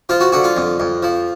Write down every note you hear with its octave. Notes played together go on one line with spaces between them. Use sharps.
F3 F4
F#4
D3 F#4
F4
F2
F2
F3